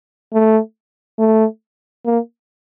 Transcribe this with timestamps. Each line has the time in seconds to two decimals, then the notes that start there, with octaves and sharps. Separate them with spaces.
0.33 A3
1.19 A3
2.06 A#3